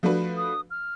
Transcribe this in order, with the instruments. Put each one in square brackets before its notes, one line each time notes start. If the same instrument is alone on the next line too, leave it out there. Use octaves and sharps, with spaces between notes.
[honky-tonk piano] F3 A3 D4 F#4 B4
[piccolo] D#6
F6